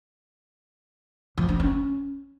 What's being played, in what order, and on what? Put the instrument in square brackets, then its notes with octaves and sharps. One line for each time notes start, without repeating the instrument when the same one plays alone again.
[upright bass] F3
D4
C#4